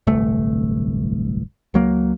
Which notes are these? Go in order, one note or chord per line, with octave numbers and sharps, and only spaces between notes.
D1 G1 C2 A3
C#2 F#3 A#3